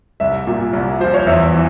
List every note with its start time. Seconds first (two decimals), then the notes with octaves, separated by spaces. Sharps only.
0.20 C2 E5
0.47 A#2
0.73 C2
1.00 F3 C5
1.14 C#5
1.27 E2 E5
1.54 E3